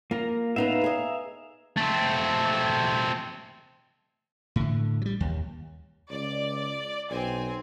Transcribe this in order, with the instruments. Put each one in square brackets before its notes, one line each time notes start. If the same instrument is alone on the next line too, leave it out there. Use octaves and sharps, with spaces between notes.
[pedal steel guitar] A#3 A#4 A#5 [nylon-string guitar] F4
[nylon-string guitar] B3 D#4 B4 [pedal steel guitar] E5 F5 A#5
[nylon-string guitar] G#4 D#5
[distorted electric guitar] A3 C4
[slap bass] A2 D3
F#3 G3
D#2
[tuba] C#2 [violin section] D5
[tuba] B1 [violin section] C4 G#5